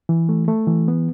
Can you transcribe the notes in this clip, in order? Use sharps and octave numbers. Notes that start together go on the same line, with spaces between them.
E3
A3
A3
E3
B3